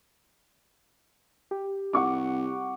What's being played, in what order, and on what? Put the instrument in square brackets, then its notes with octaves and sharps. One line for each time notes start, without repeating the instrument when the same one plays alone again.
[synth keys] G4
[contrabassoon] C2 [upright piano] F#5 C#6 D6